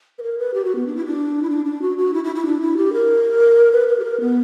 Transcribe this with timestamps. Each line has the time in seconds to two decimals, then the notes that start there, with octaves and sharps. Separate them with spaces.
0.18 B4
0.23 A#4
0.39 B4
0.54 G4
0.65 F#4
0.76 B3
0.87 D4
0.96 E4
1.06 D4
1.43 E4
1.50 D4
1.65 D4
1.82 F#4
1.98 F#4
2.14 E4
2.24 E4
2.35 E4
2.46 D4
2.61 E4
2.77 G4
2.93 A#4
3.72 B4
3.88 B4
4.00 G4
4.04 A#4
4.21 B3